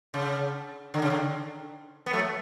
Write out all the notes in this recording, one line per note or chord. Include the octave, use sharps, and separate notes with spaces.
C#3
D3
C#3
D3
B3
F#3 A3